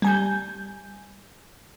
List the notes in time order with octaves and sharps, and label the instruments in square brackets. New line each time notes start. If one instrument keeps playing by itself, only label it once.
[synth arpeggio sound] G3 G#5 G6